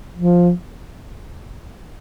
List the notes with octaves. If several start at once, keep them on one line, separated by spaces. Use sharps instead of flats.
F3